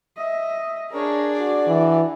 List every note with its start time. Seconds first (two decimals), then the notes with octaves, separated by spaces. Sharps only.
0.17 D#5 E5
0.91 D4 G#4 A#4 C#5
1.33 F#4 D5
1.67 E3